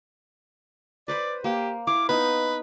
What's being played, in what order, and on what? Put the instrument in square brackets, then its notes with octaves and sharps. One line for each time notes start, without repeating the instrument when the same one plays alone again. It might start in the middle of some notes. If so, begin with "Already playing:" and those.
[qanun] B4 C5 B5 [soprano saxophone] D5
[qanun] A#3 [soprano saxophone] G4
[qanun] E4 F5 [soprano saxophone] D6
[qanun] B3 D#4 D#5 [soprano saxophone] B4